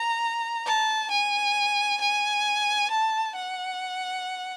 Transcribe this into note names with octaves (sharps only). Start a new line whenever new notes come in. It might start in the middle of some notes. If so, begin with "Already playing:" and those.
Already playing: A#5
A5
G#5
G#5
A5
F#5